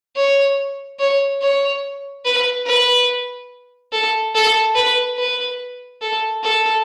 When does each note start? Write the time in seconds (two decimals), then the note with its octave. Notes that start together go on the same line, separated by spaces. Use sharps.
0.16 C#5
0.99 C#5
1.41 C#5
2.25 B4
2.66 B4
3.92 A4
4.35 A4
4.75 B4
5.17 B4
6.02 A4
6.43 A4